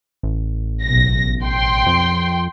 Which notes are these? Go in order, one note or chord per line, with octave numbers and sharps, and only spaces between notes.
A1
B1 A#6
G5 C6
F2